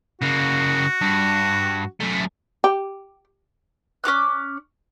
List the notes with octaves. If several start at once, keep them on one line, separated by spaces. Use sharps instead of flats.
C#3 A#3 F#4
G2
F#2 A3
G4
C#4 G4 D6 F#6